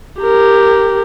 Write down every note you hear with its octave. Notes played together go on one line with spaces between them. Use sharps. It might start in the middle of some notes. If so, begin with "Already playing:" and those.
G4 A#4